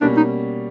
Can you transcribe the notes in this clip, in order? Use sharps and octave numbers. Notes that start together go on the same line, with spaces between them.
B2 G3 A#3 C#4 D4
D#4